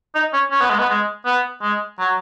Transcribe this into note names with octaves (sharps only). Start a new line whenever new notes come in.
D#4
C#4
C#4
B3
G#3
B3
G#3
B3
G#3
F#3